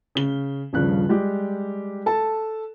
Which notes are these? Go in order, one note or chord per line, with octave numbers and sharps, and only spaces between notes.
C#3 G7
D#1 G2 C#3 F3 F#6
G3 G#3 G4
A4 A5